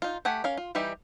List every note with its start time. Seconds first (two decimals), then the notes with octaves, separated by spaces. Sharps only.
0.02 D#4 F4
0.25 A3 G4 F#5 G#5
0.44 C#4 A#4 F5
0.57 F4
0.75 E3 G3 D#4 G4 E5